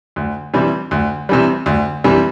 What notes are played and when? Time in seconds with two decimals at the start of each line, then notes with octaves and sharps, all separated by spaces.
0.16 D2
0.54 C3 E3 G3
0.91 D2
1.29 C3 E3 G3
1.66 D2
2.04 C3 E3 G3